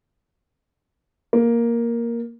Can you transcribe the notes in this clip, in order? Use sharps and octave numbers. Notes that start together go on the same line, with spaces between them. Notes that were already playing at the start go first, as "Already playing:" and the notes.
A#3